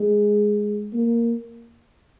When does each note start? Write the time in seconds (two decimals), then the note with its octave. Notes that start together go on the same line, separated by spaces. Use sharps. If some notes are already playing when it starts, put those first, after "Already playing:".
Already playing: G#3
0.93 A#3